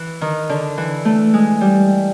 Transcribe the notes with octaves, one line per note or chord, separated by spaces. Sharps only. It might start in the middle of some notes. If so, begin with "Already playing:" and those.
Already playing: E3
D#3
D3
E3
A3
G#3
G3